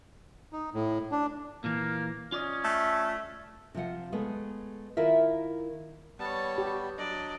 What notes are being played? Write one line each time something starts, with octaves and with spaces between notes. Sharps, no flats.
D#4
A2
D4
A#2 E3 A#3
C#4 F4 D5 D#5
A3
C3 F3 F4 F#5
G#3 A3 B3
D#3 E4 F4 A#4 E5
G3 B3 C#5 A5
G4
F#3 D4 D5 D#5